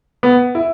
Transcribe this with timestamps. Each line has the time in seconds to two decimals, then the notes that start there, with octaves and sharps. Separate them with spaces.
0.23 B3
0.55 E4